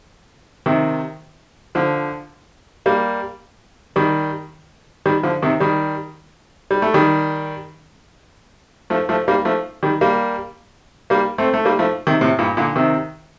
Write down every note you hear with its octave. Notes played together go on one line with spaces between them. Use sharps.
C3 D#3
D3 F3
G3 A#3
D#3 G3
D#3 G3
D3 F3
C3 D#3
D#3 G3
G3
A3
D#3 G3
F3 A3
F3 A3
G3 A#3
F3 A3
D#3 G3
G3 A#3
G3 A#3
A3 C4
A3
G3 A#3
F3 A3
C3 D#3
A2 C3
G2 A#2
A#2 D3
C3 D#3